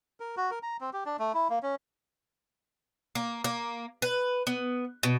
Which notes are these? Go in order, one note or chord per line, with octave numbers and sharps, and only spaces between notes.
A#4
F#4
A#4
A#5
C4
G4
D4
A3
E4
A#3
C#4
A#3
A#3
B4
B3
B2